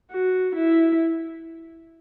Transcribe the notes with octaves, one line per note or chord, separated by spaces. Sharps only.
F#4
E4